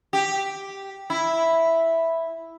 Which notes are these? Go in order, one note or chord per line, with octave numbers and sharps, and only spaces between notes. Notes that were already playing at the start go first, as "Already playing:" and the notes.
G4
E4